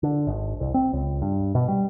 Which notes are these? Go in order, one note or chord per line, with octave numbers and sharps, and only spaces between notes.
D3
G#1
C2
C4
C#2
G2
B2
G3